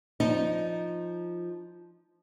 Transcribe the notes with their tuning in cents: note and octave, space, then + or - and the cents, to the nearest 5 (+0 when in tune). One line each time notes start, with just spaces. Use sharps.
F3 +0 D#4 +0